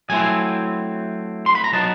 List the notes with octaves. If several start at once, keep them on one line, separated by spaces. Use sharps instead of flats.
F#3 A3 C4 E4 G#5
C6
B5
A#5
F#3 B3 D#4 A5